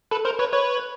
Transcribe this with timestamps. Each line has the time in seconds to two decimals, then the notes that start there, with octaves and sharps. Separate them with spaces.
0.11 A4 B4
0.25 A#4 C5
0.39 B4 C#5
0.53 B4 C#5